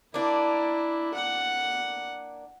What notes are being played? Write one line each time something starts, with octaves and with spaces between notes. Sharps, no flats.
A#3 D4 E4
F#5